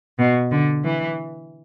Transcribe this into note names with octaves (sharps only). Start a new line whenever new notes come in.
B2
D3
E3